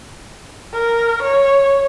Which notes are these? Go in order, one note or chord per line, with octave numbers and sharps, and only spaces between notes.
A#4
C#5